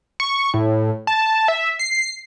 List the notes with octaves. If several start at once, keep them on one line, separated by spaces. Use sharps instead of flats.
C#6
A2
A5
E5
C7